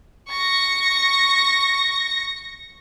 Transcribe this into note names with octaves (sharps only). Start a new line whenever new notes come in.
C#6 A#6